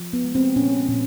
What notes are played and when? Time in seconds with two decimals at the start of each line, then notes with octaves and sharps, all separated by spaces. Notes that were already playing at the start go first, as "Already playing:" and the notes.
Already playing: F3
0.13 B3
0.24 G#3
0.35 C4
0.56 A#2 C#4
0.89 A#2